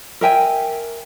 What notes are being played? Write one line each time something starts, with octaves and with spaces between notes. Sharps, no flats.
A#4 E5 G5 G#5